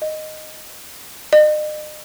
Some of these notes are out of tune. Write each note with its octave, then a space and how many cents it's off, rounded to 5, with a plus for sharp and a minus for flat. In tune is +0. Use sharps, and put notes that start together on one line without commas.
D#5 -5
D#5 -40